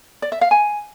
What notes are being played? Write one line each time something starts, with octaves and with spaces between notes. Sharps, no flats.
D5
E5
F5
G#5